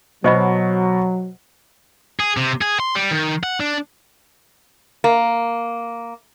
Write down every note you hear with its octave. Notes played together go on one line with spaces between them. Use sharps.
B2 F#3 C5 D#5 B5
G#4
C3
G#4
C6
G3
D#3
F#5
D4
A#3